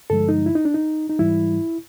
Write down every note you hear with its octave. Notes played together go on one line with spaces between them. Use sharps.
G2 D3 F3 G#3 A4
D#4
E4
D#4
D4
D#4
D#4
G#2 E3 G3 E4